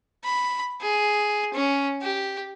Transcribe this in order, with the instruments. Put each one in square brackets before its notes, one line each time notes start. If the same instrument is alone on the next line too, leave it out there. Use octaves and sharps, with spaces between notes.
[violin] B5
G#4
C#4
G4